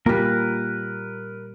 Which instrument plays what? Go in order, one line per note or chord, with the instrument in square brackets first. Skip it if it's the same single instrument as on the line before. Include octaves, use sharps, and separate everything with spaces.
[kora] A#2 G3 [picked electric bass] A#3 [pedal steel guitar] A#4 B4